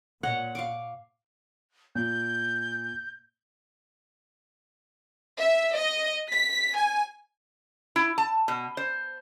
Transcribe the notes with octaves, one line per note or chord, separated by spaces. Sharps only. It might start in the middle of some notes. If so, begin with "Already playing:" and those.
A#2 C#5 D#5 F#5
F5 C#6 D6
A#2 G6
E5
D#5
B6
G#5
E4
A5
B2
C5